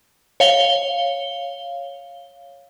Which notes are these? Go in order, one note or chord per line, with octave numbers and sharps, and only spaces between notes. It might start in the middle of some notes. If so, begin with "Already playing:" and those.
C#5 F5 G7